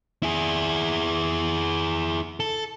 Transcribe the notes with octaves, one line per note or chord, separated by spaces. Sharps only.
E4 G#4
A4